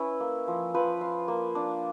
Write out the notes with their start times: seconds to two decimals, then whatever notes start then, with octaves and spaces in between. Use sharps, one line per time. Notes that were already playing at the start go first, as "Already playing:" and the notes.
Already playing: C#4 E4 B4
0.20 A#3
0.48 F3
0.74 F3 B4
1.01 F4
1.28 A#3
1.55 D4